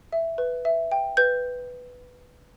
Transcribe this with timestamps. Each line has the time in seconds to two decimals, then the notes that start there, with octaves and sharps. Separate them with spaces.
0.13 E5
0.38 B4
0.65 E5
0.92 G5
1.17 B4 G6